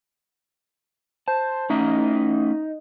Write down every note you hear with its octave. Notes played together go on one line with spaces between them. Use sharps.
C5 A5
A3 C#4 D#4 E5
D#4